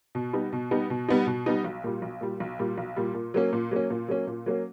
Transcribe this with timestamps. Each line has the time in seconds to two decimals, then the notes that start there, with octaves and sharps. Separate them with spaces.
0.15 B2
0.33 G3 B3 D#4
0.53 B2
0.71 G3 B3 D#4
0.90 B2
1.08 G3 B3 D#4
1.27 B2
1.46 G3 B3 D#4
1.64 B1
1.84 A#2 G3
2.02 B1
2.21 A#2 G3
2.40 B1
2.59 A#2 G3
2.78 B1
2.96 A#2 G3
3.15 A#2
3.34 F#3 A#3 C#4
3.53 A#2
3.71 F#3 A#3 C#4
3.90 A#2
4.08 F#3 A#3 C#4
4.27 A#2
4.46 F#3 A#3 C#4